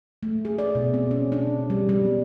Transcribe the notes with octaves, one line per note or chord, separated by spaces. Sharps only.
A3
G#4
D5
B2
C4
C#4
D4
G3
G3
B3